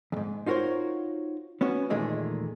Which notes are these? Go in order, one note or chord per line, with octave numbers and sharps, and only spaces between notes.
E2 G#2
D#4 F4 F#4 A#4 C5 C#5
B3 C#4 F#4 C#5
E2 A#2 D#3 G#3 A3